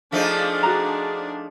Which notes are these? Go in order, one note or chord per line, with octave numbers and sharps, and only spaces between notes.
F3 A3 D4 D#4 G#4
F#4 A#5